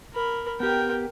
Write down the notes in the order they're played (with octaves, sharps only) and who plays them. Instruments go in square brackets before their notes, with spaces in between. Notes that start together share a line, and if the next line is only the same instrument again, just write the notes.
[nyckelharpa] A#4 B5
[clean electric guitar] B3 G4 [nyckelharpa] A#4 G5